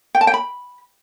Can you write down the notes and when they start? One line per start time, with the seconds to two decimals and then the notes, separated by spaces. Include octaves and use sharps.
0.15 G5
0.21 A5
0.27 G5
0.34 B5